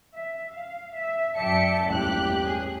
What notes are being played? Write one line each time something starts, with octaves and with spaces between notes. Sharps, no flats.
E5
F5
E5
F#2 D5 E5 G5 A5 C#7
A1 E2 G2 A#2 G4 F#6
A2 G#4